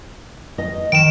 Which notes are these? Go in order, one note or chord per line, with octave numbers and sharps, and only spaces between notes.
D#5
D#3 D7 E7